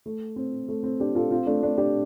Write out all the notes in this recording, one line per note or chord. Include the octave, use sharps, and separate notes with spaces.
A3
C4
A3
C4
D4 G4
F4 A4
C4 F4
A3 D4
A3 D4
D4 G4